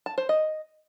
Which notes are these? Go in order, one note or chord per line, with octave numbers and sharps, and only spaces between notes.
A5
C5
D#5